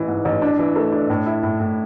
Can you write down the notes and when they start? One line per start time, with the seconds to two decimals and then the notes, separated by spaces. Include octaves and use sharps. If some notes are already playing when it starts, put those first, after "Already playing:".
Already playing: A1 E3
0.08 G#2
0.25 A1
0.42 D4
0.59 E3
0.76 A3
0.92 D4
1.10 A2
1.26 E4
1.43 A2
1.60 A2